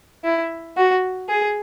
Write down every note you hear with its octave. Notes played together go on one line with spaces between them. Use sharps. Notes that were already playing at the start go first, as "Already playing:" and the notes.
E4
F#4
G#4